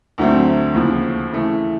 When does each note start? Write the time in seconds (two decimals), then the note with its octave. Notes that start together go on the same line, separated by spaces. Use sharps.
0.18 D2 D3 F#3 A3 C4
0.74 D#2 C#3 F3
1.32 C#3 E3 A3